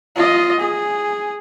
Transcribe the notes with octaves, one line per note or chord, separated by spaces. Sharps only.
F4 D#5
G#4